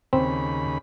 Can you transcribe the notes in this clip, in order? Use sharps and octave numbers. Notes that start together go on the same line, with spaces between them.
D#2 C#3 C4 B5